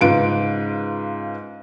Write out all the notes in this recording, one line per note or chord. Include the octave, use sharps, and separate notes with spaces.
G#2 C#3 F4 B4 D7